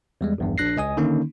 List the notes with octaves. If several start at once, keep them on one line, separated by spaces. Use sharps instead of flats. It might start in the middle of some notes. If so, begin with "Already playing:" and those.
E2 G3 G#3
A#1 E2 G2
A#1 D4 F#6 A#6 C7
C#2 D#5 G#5 D#6
D3 D#3 A#3 C#4 D#4